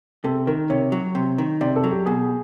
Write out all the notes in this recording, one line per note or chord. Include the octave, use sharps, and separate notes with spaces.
C3 A4
D#3 A#4
C3 C#5
F#3
C3
D#3
C3 D5
A4
F#3
G4
B2 G#4